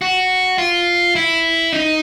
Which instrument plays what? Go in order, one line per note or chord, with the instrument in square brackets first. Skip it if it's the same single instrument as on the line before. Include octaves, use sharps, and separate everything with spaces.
[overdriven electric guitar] F#4
F4
E4
D#4